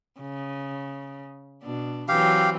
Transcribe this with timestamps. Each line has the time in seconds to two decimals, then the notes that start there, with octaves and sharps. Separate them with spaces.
0.21 C#3
1.63 B2 D4
2.08 E3 F#3 C4 G4 F5